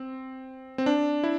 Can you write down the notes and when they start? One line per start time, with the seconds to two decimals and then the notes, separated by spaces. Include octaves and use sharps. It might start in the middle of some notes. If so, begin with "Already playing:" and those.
Already playing: C4
0.78 C4
0.86 D4
1.24 E4